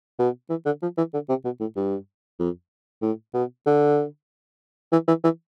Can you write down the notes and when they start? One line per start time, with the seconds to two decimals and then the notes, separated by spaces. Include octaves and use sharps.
0.19 B2
0.50 E3
0.66 D3
0.82 F3
0.98 E3
1.14 D3
1.29 C3
1.45 B2
1.60 A2
1.76 G2
2.40 F2
3.02 A2
3.34 B2
3.66 D3
4.93 E3
5.08 E3
5.24 E3